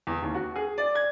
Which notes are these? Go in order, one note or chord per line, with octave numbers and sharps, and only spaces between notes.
E2
D#2
F#4
G#4
D5
G#6